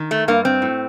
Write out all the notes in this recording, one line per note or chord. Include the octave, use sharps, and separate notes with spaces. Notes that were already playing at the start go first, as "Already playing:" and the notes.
Already playing: D#3
A3
G2 A#3
C4
A2